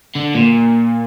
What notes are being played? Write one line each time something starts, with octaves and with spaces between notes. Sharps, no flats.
D3
A#2